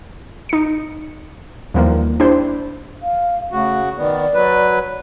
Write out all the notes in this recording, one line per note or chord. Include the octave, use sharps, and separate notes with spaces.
D#4 C#7
D#2 E3 F3 G3 A#3
D4 E4 G4 C5
F5
C#3 A3 F#4
D#3 B3 D5
F#3 B4